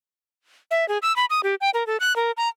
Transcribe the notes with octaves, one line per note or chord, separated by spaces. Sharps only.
E5
G#4
E6
B5
D#6
G4
G5
A#4
A4
F#6
A#4
A#5